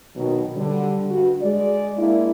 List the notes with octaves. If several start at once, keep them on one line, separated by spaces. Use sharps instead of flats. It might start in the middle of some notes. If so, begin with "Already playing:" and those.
B2 D#3 F#3
D3 G3
G2 G3 F#4
G#3 D5
G#3 A#3 D4 E4